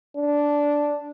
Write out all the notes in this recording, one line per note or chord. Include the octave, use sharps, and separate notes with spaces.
D4